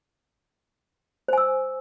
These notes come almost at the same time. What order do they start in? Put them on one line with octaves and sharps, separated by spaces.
C5 G#5 E6